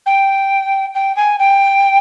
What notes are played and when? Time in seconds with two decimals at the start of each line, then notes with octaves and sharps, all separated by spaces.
0.06 G5
0.95 G5
1.16 G#5
1.39 G5